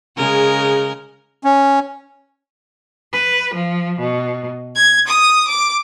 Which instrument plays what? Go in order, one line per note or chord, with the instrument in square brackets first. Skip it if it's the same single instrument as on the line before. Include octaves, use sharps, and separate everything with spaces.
[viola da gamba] C#3 G#3 A#4
[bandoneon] C#4
[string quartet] B4
F3
B2
G#6
D#6
D6